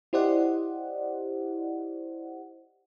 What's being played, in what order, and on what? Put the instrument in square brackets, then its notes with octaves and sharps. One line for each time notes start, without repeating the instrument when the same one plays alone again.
[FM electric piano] E4 G4 C5 D5 D#5 F#5